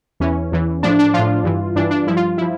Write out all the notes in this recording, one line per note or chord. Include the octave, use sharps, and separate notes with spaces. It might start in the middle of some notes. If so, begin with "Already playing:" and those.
E2 E3 C#4
E2 E3
A2 F3 D4
D4
F3 F4
A2
G2 E3
G2 E3 D4
D4
G2 F3 E4
F4
F3 E4